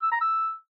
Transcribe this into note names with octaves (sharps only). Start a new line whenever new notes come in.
E6
A#5
E6